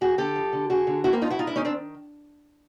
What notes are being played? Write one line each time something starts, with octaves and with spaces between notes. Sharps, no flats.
F2 F#4 G#4
D3 G4 A4
F2
D3
D3 F#4 G#4
D3
F2 E4 F#4
A#3 C4
F2 D#4 F4
E4 F#4
G#2 D#4 F4
D4 E4
D#3 C#4 D#4
C4 D4